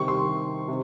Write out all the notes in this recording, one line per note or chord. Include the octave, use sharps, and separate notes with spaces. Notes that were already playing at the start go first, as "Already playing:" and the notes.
Already playing: C3 D#3 G3 C#6
C6
C3